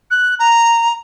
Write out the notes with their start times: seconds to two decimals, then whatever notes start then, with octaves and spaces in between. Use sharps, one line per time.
0.11 F#6
0.39 A#5